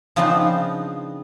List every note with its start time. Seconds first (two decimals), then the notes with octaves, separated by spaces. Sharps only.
0.16 C#3 F3 B3 C4 D4 D#4